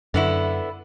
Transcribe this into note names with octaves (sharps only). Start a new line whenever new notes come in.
F#2 D3 B3 E4